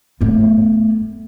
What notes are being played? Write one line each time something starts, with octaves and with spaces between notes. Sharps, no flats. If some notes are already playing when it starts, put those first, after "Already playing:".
A3 B3